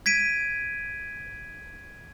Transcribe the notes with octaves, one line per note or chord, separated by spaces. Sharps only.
G#6 B6 D7 D#7